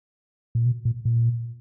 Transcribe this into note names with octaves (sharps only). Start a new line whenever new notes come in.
A#2
B2
A#2
A#2